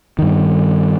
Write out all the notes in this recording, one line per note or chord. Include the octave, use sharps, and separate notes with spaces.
G2 D#3